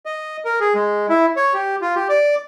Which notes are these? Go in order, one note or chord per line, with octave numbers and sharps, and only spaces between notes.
D#5
A#4
G#4
G#3
E4
C#5
G4
F4
G4
D5